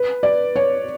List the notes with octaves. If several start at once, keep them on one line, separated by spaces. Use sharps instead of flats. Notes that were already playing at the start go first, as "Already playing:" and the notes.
Already playing: B4
D5
C#5